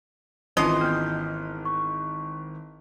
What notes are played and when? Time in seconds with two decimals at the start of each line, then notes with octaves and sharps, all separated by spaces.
0.57 G#1 E3 C#4 D#4 F4 D#5 C6 C7
0.81 B3 F6 G6
1.65 C#6